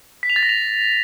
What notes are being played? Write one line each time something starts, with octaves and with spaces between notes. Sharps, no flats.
B6
F7
A6
A#6
F7